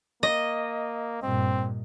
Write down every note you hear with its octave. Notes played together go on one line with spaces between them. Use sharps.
A#3 D#5
G2 A#2 C4